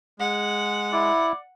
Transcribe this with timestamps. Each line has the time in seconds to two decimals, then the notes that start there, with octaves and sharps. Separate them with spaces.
0.20 G#3 F#5
0.93 E4 D5